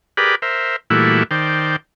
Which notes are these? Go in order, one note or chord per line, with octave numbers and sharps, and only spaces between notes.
G4 G#4 A#4 B4 D5 B5
A#4 C5 E5
A#2 E3 G3 A3 E4 F#4
D#3 C5 D5 G5